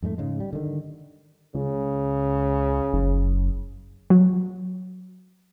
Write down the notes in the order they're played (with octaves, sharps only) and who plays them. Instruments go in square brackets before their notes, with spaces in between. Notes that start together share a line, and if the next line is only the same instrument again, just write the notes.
[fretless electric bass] F2 G#2 G3 A3
G#2 C#3 G#3
G3
D3 D#3
[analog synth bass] C#2 [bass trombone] C#3
[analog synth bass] F#1
[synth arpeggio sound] F#3